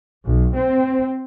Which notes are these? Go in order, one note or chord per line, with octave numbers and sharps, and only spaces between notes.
B1
C4